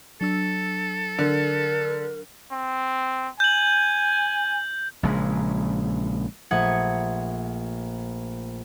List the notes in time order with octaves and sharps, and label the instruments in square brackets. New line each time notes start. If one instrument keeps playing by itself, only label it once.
[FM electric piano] F#3 D4 E6 [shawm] A4
[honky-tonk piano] D3 [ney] A#4
[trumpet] C4
[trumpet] G#5 [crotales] G6 F#7
[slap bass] A#1 C#3 G#3
[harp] A#1 A3 F#5 D#6 G#6 C#7